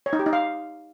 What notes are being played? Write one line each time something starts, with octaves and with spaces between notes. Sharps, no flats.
C#5
D#4
G4
D#4
F5